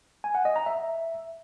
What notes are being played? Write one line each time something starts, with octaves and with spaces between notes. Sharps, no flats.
G#5
F#5
D#5
A#5
E5